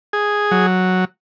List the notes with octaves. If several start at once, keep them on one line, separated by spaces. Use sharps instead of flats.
G#4
F#3